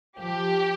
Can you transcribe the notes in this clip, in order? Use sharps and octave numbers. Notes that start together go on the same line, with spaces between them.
F3 G4